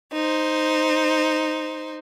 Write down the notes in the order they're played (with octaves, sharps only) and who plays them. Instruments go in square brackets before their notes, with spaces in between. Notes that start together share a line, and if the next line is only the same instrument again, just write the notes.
[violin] D#4 C5